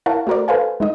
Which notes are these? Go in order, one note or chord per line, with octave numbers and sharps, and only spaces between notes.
E4 A#4 C#5 F5 F#5 A5
A3 F#4 A#4 C5 D5
A4 B4 C5 F5 G#5
G#3 D#4 D#5